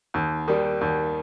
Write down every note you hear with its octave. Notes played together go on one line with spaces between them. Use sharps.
D#2
D#3 G3
D#2